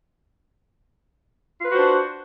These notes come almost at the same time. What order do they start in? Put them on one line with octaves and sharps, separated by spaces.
F4 B4 F#4 C5 D4